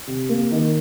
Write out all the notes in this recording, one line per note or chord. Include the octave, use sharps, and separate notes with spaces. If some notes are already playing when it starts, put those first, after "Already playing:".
C3
A#3
D#3